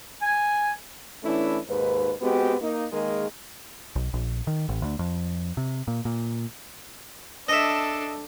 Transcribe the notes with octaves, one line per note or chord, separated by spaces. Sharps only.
G#5
E3 A3 C#4 D4 E4
D#2 G#2 B4
G#3 B3 C4 F#4 G4
A#3 D#4
D#3 G#3 A#3 G#4 A#4
B1
A#1
D#3
A1
D2
F2
C3
A#2
A#2
D4 A4 D#5 E5